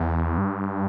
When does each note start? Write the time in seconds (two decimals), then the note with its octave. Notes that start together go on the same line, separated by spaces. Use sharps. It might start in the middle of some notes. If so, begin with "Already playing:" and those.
Already playing: E2
0.38 G2